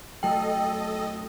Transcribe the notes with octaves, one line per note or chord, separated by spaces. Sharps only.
F1 F#3 A3 A4 D#5 G5